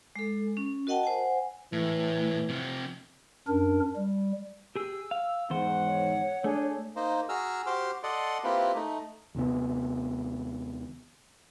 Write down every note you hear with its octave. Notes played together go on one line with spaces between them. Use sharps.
G#3 A4
C#4
F#4 A#4 D#5 F#5 G5 A5
C5 F#5 G#5
A2 E3
C3 F3
F#2 D4 A#4
G3
G4 G#4 E6
F5
E2 G#2 D#3 C5 F#5
C#5
A3 D4 G#4
A#3 D#4 C5
F#4 G#4 A#5 E6 F6
F#4 G4 C5 C6 D6 F6
A4 D5 D#5 F#5 C6
A#3 C4 E4 F4 G4 B4
A3 D#4
D#2 C3 B3